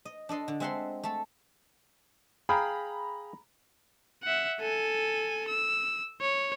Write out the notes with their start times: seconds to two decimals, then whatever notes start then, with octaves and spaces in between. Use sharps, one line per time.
0.05 D#5
0.29 D4 A4 D#5 C6
0.48 D3
0.60 G#3 C4 E5 F#5 A5 C6
1.03 A3 A4
2.49 G#4 F5 G5 A#5 B5
4.23 E5 F#5
4.61 A4 G#5
5.48 E6
6.21 C#5